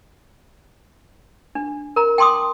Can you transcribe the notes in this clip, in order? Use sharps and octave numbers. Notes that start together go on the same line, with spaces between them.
D4
A#4 A#5
G5 A5 C6 D6 D#6